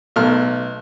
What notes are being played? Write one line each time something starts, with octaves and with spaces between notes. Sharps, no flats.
B1 A3 F6